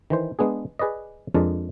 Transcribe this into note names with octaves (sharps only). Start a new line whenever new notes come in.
D#3 E3 C5
G#3 B3 D4 G#4
G#4 B4 D5 D#5
F2 G#3 D4 A#4 D5